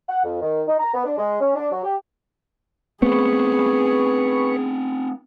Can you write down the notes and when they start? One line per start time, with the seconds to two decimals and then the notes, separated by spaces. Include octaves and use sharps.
0.09 F#5
0.24 F2
0.41 D#3
0.67 D#4
0.79 A#5
0.93 B3
1.05 D4
1.18 G#3
1.41 C#4
1.55 D4
1.71 F#3
1.84 G4
3.02 A3 B3 C4 G#4 B4 C#6